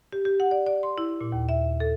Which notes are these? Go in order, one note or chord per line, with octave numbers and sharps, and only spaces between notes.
G4
G4
F#5
D5
D5
C6
E4
A#2
D#2
E5
A4